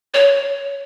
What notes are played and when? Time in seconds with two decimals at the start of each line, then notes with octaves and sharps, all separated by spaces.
0.14 C#5